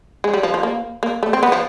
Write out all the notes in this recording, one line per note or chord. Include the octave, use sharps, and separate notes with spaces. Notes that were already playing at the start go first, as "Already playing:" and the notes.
G#3
G3
F3
F3
A#3
A#3
A3
C4
B3
F3